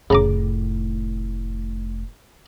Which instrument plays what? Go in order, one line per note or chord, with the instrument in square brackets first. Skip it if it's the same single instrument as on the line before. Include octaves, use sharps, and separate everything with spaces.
[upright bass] F1 A2 [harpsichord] C#3 A#5 D6